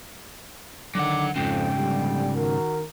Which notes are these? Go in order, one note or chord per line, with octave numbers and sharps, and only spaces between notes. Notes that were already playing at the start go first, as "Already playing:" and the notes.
D3 D#3 F#3 F#5 D6
F2 G#2 C#3 G5
A#1 D3 G3
D#3 F#4 A#4